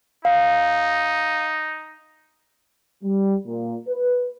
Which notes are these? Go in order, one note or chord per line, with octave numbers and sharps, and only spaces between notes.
D#4 F5
G3
A#2
B4